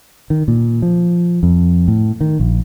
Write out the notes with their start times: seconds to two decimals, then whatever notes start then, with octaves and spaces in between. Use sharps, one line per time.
0.30 D#3
0.48 A#2
0.82 F3
1.43 F2
1.88 A2
2.21 D#3
2.40 A#1